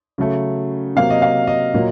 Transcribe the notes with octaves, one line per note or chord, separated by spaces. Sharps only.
C#3 F#3 A3
C3 F#3 A#3 F5
D#5
F5
D#5
A#2 F#3 A#3